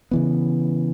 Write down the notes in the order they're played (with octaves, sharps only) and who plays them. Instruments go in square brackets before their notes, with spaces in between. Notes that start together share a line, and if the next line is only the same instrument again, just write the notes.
[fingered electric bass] C#3 E3 B3